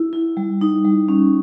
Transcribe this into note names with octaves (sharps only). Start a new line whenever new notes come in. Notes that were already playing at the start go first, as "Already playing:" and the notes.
Already playing: E4
E4
G3
D#4
G3
C#4